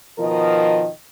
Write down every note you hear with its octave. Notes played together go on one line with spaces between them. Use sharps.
B2 D#3 F3 A#4 D#5